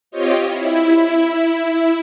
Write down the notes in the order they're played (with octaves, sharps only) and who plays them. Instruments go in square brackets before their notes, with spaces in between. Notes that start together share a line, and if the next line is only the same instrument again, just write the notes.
[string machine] C4 F4 G4 C#5 D#5
E4